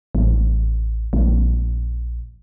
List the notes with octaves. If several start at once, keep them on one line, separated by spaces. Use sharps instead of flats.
A1
A#1